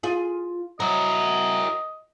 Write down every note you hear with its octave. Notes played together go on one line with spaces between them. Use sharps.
F4 G#4
F#3 E4 A#4 D#5